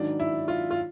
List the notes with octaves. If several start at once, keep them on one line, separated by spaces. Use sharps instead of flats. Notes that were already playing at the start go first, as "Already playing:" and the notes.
Already playing: G#2 D#3 F#3 D4
E4
F4
F4